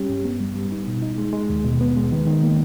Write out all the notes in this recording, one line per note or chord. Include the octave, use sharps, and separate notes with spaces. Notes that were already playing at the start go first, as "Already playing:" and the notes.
Already playing: G3 C#4 G4
G2
B3
G3
G3
D#4
B2
D#4
G#3
G#3
D#2
B2
B3
G#3
D#3
D#3
A#3